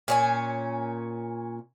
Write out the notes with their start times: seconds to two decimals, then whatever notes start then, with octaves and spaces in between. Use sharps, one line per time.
0.08 A#2 C#4 G#5